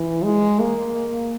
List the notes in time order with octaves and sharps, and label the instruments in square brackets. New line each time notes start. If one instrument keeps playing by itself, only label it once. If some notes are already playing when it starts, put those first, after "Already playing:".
Already playing: [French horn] E3
G#3
A#3